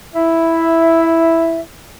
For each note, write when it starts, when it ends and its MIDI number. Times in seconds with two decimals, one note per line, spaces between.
0.15 1.60 64
0.15 1.60 76